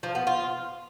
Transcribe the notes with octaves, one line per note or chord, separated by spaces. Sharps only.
F3
B3
F4